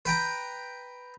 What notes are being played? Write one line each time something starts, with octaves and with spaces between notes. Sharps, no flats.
B4 G5 A#5